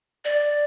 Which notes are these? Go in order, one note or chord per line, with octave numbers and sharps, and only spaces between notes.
D5